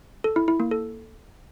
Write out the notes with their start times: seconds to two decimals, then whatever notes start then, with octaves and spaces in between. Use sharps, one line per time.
0.24 A4
0.36 E4
0.48 E4
0.60 A#3
0.71 A4